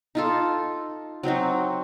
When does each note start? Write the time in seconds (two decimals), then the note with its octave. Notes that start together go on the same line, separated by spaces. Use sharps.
0.15 D#4 F4 A4
1.23 F#3 C4 D#4 F#4